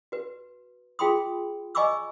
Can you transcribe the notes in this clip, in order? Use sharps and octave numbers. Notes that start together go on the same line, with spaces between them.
F#4 B4
F4 G#4 G5 B5 C6 D#6
D#5 G#5 B5 C#6 D6 E6